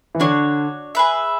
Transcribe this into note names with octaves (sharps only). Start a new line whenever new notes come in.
E3
D3 D4 F#4 C#5
G#4 B4 E5